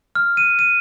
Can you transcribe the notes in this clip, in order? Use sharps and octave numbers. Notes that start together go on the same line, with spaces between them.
F6
D#7
D#7